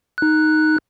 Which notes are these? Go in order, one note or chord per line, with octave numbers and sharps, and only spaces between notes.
D#4 F#6